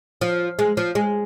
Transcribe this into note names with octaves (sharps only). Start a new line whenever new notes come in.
F3
G#3
F3
G#3